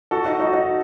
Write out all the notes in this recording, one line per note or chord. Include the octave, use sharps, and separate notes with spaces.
F#4 A4
D#4 F#4
D#4 F#4
D#4 F#4